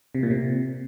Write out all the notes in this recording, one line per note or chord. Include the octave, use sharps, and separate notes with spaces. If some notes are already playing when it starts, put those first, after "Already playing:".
C3
A#2
C3